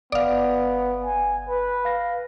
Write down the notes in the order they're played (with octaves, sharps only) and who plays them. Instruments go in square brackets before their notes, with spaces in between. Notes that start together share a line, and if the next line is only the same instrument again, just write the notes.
[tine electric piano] G1 D#6 [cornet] B3 [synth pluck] D5 F5
[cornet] G#5
B4
[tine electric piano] F5 A#6